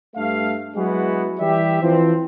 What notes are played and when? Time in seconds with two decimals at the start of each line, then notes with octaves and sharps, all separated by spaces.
0.16 G2 A3 F5
0.76 F#3 G#3 B3 E4 F#4
1.39 E3 G3 G4 E5
1.82 E3 F3 C4